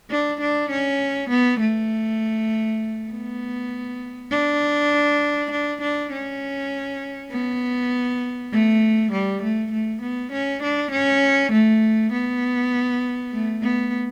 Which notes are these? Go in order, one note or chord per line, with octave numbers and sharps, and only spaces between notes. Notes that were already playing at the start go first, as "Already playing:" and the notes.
D4
D4
C#4
B3
A3
B3
D4
D4
D4
C#4
B3
A3
G3
A3
A3
B3
C#4
D4
C#4
A3
B3
A3
B3